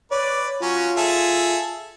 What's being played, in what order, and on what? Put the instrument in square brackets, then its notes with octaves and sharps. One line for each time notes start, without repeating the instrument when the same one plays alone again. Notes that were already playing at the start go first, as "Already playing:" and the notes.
[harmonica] B4 D5 [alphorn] C#5
[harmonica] F#3 C#4 [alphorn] F4
[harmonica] G#4 A4 E5